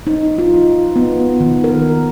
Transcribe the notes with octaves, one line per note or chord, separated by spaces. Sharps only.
D#4
F4
B3
D#3
A#4